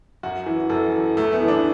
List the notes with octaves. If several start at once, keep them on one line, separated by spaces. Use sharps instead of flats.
F#2 F#4
E3
F#2 A4
E3
F#2 A3
B3
E3
D4